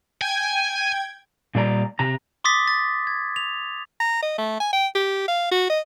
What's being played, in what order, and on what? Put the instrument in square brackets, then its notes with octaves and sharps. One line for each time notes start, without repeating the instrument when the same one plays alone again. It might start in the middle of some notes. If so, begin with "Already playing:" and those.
[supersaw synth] G5 G#6 [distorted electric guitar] G#5
[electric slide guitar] A#2 G3 D5 A#5
C3 A#5
[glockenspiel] C6 D6 D#6 A6 B6
A6
G#6
F7
[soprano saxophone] A#5
D#5
A3
G#5
G5
G4
F5
F#4
D#5